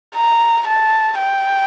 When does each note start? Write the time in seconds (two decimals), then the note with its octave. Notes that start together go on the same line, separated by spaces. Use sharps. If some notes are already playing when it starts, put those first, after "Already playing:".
0.15 A#5
0.68 A5
1.19 G5